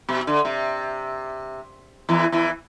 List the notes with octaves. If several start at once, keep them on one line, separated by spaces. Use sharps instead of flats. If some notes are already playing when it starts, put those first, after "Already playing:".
B2
D3
C3
E2 E3
E2 E3